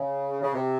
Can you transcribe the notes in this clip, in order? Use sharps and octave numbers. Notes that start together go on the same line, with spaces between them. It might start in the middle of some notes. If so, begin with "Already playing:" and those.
Already playing: C#3
C#3
C3